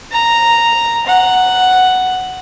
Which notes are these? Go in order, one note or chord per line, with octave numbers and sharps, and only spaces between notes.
A#5
F#5